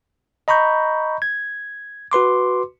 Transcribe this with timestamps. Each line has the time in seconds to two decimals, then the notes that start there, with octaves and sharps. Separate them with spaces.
0.48 D#5 A#5 B5 C#6 G6
1.22 G#6
2.12 F#4 B4 C6 D6